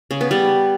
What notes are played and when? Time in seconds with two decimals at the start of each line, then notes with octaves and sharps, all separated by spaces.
0.11 C#3
0.21 B3
0.31 G3